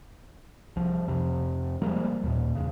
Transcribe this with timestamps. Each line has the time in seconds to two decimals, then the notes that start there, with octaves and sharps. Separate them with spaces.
0.76 C2 F3
1.07 F2 C3
1.82 F3 G3 G#3 A#3
2.23 D#2 A#2
2.55 E2 C#3